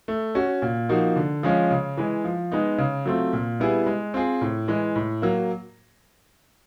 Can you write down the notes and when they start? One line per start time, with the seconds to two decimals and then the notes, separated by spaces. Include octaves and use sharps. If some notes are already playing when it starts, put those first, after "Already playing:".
0.08 A3
0.35 C#4 F#4
0.62 A#2
0.89 F3 A#3 D#4 F#4
1.16 D3
1.43 F3 G#3 C#4 F4
1.71 C#3
1.97 E3 G#3
2.24 F3
2.52 G#3 B3 D#4
2.78 C#3
3.06 F#3 A3 C4 F4
3.33 A#2
3.60 G3 B3 E4 G#4
3.87 G#3
4.14 C4 F4 G#4
4.41 A2
4.68 E3 G#3
4.96 A2
5.22 F#3 A#3